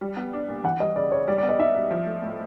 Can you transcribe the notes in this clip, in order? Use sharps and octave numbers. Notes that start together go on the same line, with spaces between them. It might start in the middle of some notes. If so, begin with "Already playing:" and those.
G3
B3
D4
A#2
E3 F#5
G3 D#5
C#3 D5
C#3 C#5
G3 D5
D5
B3
D#5
D#4 E5
B2
F3
A3
A2